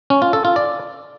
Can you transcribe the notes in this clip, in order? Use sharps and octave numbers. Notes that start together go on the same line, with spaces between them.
C#4
F4
A4
F4
D5